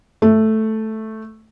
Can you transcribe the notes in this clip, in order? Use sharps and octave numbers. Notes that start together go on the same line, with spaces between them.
A3